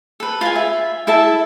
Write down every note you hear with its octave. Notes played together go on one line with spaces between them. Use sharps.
A4 B4
F4 B4 F5 G#5
E5
E4 A4 E5 A5